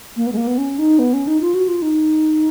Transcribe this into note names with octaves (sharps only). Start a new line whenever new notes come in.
A#3
B3
G#3
A#3
B3
C#4
D#4
B3
C#4
D#4
F4
F#4
F4
D#4